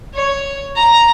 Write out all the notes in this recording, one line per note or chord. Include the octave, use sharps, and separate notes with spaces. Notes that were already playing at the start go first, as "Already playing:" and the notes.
C#5
A#5